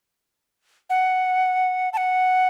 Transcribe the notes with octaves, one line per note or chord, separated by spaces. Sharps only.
F#5
A5
F#5